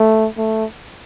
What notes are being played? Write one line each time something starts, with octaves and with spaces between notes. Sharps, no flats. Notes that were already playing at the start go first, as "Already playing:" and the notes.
Already playing: A3
A3